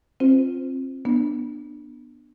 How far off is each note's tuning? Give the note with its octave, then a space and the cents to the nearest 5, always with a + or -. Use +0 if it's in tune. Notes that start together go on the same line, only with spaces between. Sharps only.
C4 +30 F4 +0 C5 -25
B3 -15 D4 +20